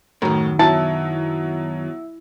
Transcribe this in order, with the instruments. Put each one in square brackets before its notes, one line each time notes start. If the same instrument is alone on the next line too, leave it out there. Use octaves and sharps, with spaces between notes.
[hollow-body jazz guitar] F#2 D#3 [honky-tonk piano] A2 A#5
[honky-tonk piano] B2 F#3 [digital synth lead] E4 [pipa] A5